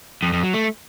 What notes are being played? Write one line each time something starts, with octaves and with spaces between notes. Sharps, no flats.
F2
F2
F#3
A3